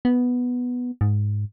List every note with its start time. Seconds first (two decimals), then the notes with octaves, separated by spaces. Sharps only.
0.05 B3
1.01 G#2